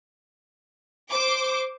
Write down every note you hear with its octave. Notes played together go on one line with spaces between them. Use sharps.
C5 D6